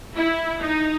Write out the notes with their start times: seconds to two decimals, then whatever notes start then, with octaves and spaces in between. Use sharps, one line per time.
0.15 E4
0.62 D#4